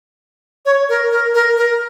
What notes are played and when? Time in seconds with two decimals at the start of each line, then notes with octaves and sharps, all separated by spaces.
0.66 C#5
0.89 A#4
1.11 A#4
1.34 A#4
1.57 A#4